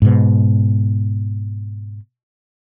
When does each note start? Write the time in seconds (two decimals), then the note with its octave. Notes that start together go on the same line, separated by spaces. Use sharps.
0.02 G#2 B2